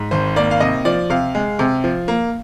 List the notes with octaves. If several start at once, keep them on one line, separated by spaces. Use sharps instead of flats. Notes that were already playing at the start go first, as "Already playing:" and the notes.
Already playing: G#2
G#1 C5
A#3 D5
F5
C3 D#5
F3 D5
C3 F5
G#3
C3
F3
A#3